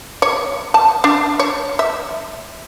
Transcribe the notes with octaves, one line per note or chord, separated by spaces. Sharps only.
C#5
A5
D4
C#5
E5